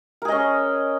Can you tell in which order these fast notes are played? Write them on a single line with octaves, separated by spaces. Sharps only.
A#4 G#4 D#5 C#4